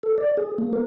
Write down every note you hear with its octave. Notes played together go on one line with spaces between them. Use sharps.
A4
D5
G#4
A#3
A#4